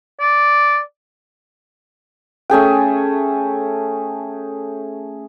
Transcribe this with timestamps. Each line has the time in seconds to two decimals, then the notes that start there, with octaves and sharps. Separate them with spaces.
0.20 D5
2.50 A3 C#4 G#4 G5